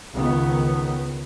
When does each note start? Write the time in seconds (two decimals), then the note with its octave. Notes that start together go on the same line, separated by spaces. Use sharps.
0.13 C#2 D#3 B3